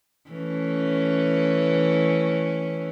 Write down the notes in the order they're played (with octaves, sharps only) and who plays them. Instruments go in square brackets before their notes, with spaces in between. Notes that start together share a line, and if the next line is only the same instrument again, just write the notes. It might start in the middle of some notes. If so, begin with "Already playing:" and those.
[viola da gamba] E3 A3 C#4